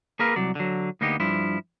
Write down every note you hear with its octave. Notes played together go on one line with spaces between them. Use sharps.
A#3 G#4 A#4 B4 F5
C2 F#3 D5
D3 F#3
D2 A#3 B3 D#4 G4
G2 F3 E4